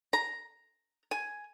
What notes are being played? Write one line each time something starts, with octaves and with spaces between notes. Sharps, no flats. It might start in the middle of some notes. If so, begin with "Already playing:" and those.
A#5
G#5